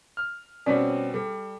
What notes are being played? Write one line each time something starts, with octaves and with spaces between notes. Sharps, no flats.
F6
B2 G3 C4 C#4 D5
G3 A4